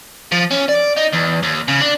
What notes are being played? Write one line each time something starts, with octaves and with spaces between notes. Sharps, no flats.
F3
C#4
D5
D#4
E2
D#2
C#3
D4